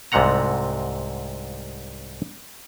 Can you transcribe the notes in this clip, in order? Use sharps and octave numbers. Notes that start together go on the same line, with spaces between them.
C2 G#2 C3 A3 F#5 A#5